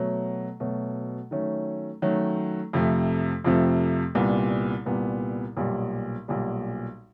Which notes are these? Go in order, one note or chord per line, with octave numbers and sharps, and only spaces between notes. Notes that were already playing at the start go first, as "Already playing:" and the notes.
Already playing: B2 F#3 A3
B2 F#3 A3
D#3 F#3 A3 C#4
D#3 F#3 A3 C#4
F2 C3 F3 A3
F2 C3 F3 A3
C2 A#2 G3 B3
C2 A#2 G3 B3
B1 A#2 G3
B1 A#2 G3